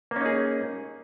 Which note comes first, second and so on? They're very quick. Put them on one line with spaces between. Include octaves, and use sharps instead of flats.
A#3 C#4 D#4 G#4